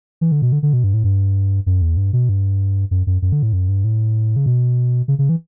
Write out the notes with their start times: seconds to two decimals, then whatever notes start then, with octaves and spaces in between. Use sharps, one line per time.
0.21 E3
0.32 D3
0.42 B2
0.52 D3
0.63 D3
0.73 B2
0.84 G2
0.94 A2
1.04 G2
1.66 F#2
1.82 E2
1.97 G2
2.13 B2
2.29 G2
2.91 F#2
3.07 F#2
3.22 F#2
3.32 D3
3.43 A2
3.53 F#2
3.68 G2
3.84 A2
4.36 C#3
4.46 B2
5.08 C#3
5.19 C#3
5.29 E3